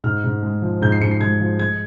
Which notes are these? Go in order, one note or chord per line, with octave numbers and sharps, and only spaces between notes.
G#2 F6
G#2
G#3
F3
G#2 G6
C7
G#2 C#7
C7
G#3 G#6
F3
G#3 G#6